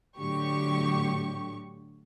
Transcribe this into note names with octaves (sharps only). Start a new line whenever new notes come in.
A2 D3 F#3 G4 C#6